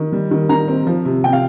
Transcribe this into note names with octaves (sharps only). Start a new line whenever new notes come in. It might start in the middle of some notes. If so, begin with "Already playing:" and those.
Already playing: D#3
G3
D#3
D#3 A#5
C4
F3
C3
C3 G5
F5